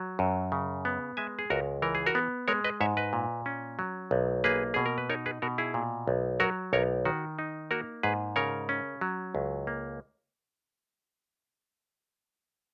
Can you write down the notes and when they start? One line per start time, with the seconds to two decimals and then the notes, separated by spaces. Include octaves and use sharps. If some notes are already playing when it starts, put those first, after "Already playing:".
Already playing: F#3
0.19 F#2
0.52 C#3
0.85 B3
1.17 G#3 E5 G#5
1.39 G#4
1.50 C#2 F#4 A#4
1.82 E3 A#4
1.95 G#4
2.06 F#4 A#4
2.15 B3
2.48 G#3 A#4 C#5
2.64 B4 D#5
2.81 G#2 C#5 E5
2.97 B4 D#5
3.13 A#2
3.46 C#4
3.79 F#3
4.11 B1
4.44 A#3 G#4 B4
4.74 B2 G#4
4.86 A#4
4.98 B4
5.10 D#4 A#4 C#5
5.26 G#4 B4
5.42 B2 F#4 A#4
5.58 E4 G#4
5.74 A#2
6.08 B1
6.40 F#3 F#4 A#4
6.73 B1 A#4 C#5
7.05 D#3 F#4
7.39 D#4
7.71 A#3 F#4 A#4
8.03 G#2 G#4 B4
8.36 C#3 A#4 C#5
8.69 C#4
9.01 F#3
9.35 C#2
9.67 A#3